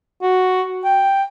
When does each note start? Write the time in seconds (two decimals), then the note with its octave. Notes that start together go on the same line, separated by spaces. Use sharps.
0.22 F#4
0.84 G5